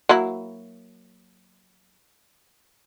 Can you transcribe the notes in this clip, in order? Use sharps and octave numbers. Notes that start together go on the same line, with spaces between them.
F#3 A#3 E4